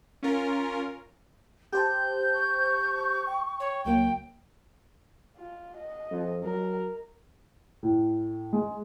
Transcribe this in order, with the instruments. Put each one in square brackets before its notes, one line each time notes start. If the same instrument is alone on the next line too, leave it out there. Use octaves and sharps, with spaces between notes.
[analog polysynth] C#4 F4 A#4
[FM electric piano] G4 C5 A5 [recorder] G6
[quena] C#6
[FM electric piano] G5
[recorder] C#5
[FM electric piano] C#2 F#3 A#3 [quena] C#5 [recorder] G5
[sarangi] F4
D#5
[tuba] F2
[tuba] F#3 [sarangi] A#4
[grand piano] A2
G#3